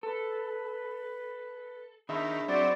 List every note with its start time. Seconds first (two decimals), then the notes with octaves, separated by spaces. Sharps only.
0.03 A4 B4
2.09 D#3 D4 G#4 E5 B5
2.48 F#3 C4 D5